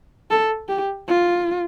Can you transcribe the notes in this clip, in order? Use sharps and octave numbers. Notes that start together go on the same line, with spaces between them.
A4
G4
F4